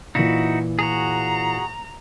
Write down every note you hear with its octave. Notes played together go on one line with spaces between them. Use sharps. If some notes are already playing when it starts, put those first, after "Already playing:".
A#2 E3 D#4 E4 F#4
F#4 G#4 A#5